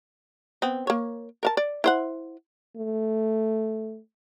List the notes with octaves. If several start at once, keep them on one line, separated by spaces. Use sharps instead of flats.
B3 C4
A#3 C#5
A#4 F5 A5
D5
E4 C5 F#5
A3